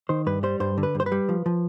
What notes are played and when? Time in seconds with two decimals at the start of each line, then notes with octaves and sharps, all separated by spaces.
0.09 D#3 C5
0.26 G2 B4
0.43 G3 C5
0.60 G2 C5
0.78 D3
0.83 B4
0.95 G2
1.00 C5
1.06 B4
1.12 G3
1.29 F3
1.46 F3